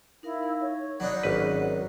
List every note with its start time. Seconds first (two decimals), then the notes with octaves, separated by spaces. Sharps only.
0.23 D#4 E4 A#4 F5
0.61 C#5
1.00 F#3 D4 D#4 F#5 B5
1.23 G#1 C#4 B4 D5 F#5